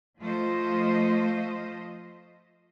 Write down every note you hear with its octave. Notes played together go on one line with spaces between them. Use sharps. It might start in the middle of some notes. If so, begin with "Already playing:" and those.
F3 A3 F4 C5 D#5